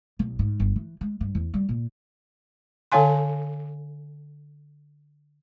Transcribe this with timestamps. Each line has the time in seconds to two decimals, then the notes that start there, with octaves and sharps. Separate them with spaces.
0.19 B1
0.39 G#2
0.60 G1
0.76 E3
1.01 G#3
1.21 G2
1.35 E2
1.54 G3
1.69 A#2
2.92 D3 A4 C#5 F5 G#5 C6